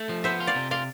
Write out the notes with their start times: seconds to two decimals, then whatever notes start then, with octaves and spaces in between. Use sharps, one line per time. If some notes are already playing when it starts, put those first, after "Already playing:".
Already playing: A3 A4
0.09 F3
0.24 B3 C5 E5
0.40 F4
0.47 D5 F5
0.55 C3
0.71 F4 D5 F5